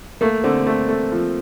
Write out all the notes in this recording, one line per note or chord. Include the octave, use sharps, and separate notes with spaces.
A3 A#3
D3 C4
A3
A3
F3